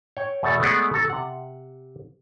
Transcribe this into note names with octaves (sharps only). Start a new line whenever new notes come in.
C#5 G5
E2 B2 A3 A4 A5
G#3 A3 B3 G#4 D5 F#5
A4 A5 A#5
C3 F#5